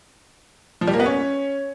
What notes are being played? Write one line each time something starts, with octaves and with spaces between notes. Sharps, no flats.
F3
G3
A#3
B3
C#4